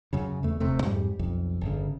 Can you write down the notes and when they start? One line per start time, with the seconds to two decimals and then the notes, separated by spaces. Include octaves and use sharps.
0.13 F#2 C#3
0.43 E2 A3
0.60 D#1 C3 A3
0.83 F2 G#2 G3
1.19 B1 F2
1.61 G1 C#3